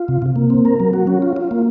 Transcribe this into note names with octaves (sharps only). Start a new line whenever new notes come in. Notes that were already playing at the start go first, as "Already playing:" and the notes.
Already playing: F4
C3
C3
A#3
C4
A#4
F#3
F#4
C#4
F4
F4
A#3